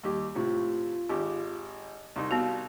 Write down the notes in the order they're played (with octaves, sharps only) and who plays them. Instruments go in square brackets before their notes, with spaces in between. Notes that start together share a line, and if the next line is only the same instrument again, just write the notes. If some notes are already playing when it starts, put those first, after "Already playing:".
[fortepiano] D#2 G4 [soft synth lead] G3
[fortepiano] A2 C3 C#6 [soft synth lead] F4
[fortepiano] G#1 G4
[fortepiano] C2 D#4 [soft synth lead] C6
[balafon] B3 F#4 [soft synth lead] F5